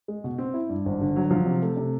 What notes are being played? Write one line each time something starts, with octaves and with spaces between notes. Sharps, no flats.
G#3
B2
C4
E4
G2
G#1
D3
F#3
F3
C3
A3
C3